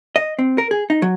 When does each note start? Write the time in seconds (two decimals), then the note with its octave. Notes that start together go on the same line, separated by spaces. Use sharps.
0.16 D#5
0.39 C4
0.58 A#4
0.71 G#4
0.90 D#4
1.02 F#3